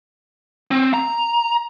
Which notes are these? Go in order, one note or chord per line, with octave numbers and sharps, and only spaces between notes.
C4
A#5